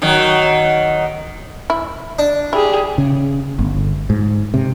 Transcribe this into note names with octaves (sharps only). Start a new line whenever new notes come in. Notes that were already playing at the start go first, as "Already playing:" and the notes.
D#3 F#3
E4
D4
E4 G4 G#4
C#3
G1
G#2
C3